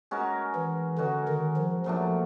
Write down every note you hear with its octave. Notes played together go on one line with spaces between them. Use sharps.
G#3 C#4 F#4 A#4
E3
D3 G#3 C#4 F#4 A#4
D#3
F3
A#2 F3 F#3 A3 D4